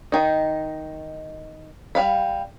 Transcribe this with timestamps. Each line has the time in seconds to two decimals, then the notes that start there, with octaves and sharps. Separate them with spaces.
0.12 D#3 D#4
1.95 G3 F5 B5